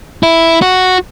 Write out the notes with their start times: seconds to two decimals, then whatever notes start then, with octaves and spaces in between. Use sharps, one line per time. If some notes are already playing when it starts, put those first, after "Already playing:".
0.23 E4
0.62 F#4